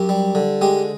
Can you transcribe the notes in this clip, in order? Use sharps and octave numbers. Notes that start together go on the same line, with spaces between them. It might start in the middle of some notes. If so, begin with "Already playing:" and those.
Already playing: F#2 G4
G3
D3
G#3 G4